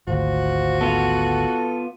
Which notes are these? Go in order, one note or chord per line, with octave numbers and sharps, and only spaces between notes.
G#1 D2 F3 F#4
B3 F4 A4